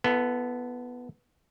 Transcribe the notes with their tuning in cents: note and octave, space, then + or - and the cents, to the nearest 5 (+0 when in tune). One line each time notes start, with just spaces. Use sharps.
B3 +0 F4 -45 A4 +0